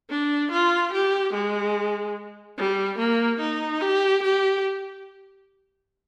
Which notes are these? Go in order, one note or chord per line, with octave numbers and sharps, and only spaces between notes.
D4
F4
G4
G#3
G3
A#3
D#4
G4
G4